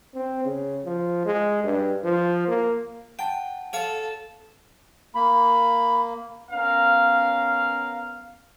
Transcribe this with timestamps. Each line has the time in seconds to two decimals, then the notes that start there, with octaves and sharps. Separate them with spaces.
0.15 C4
0.44 C#3
0.85 F3
1.26 G#3
1.64 G2
2.04 F3
2.47 A#3
3.19 F#5 G5 A5
3.73 A4 C#5 F5 C#6
5.15 A#3 B5
6.51 B3 C#4 A#4 F5